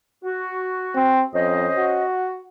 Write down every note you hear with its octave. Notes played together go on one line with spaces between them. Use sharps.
F#4
C4
F2 C#4 C5 D#5
F#4